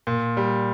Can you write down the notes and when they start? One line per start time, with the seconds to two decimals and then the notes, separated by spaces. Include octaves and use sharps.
0.07 A#2
0.37 G3